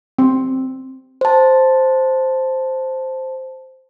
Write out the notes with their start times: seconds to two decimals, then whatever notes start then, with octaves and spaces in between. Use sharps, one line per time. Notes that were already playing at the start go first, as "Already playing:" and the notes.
0.19 C4
1.21 C5 A5